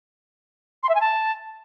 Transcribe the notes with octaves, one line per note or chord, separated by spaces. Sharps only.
C6
E5
G#5
A5